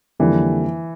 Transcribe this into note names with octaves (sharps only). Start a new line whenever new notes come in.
F2 D3 E3 G3 A#3